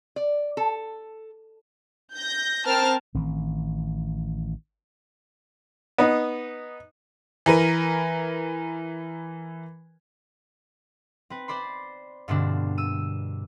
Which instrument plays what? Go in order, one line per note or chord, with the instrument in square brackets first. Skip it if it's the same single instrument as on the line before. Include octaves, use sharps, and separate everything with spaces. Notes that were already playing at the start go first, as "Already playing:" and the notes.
[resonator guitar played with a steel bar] D5
A4
[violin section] G6 A#6
C4 A#4 A5 F6
[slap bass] A1 D#3 C4
[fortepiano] B3 D#4
[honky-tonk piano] E3 A#4 B4
[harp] C4 B4
C5 D5 B5 C6
G2 B2 D3 A#3 C4 D4
E6 D#7